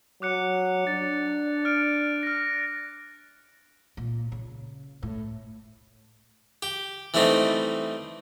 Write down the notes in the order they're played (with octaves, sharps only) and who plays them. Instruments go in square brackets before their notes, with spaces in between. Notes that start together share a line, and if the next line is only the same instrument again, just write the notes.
[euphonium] F#3 [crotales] D6 F#6 C#7
[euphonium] D4 [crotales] A6
[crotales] F6 D7
F6 A#6
[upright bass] A#2
C#3
A2
[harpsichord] G4
E3 G3 A3 C4 D#4